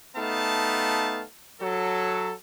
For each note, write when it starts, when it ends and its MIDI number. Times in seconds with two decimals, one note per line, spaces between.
0.17 1.23 57
0.17 1.23 59
0.17 1.23 63
0.17 1.23 77
0.17 1.23 81
1.61 2.32 54
1.61 2.32 69